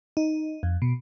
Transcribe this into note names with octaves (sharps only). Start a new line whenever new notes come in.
D#4
F2
B2